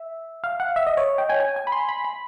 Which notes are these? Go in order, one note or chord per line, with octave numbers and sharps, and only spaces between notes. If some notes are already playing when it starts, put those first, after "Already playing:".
Already playing: E5
F5
F#5
E5
D#5
C#5
G5
G#5
G#5
G#5
B5
C6
B5
B5